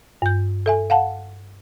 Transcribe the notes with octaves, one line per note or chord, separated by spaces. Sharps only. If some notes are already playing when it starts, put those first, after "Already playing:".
G2 G6
A4 E5 G#5
F5 F#5 A5